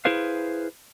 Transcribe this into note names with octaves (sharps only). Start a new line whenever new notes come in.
E4 G#4 B4 C5 F5